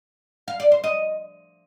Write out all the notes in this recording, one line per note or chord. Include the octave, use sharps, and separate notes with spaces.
F5
D5
C5
D#5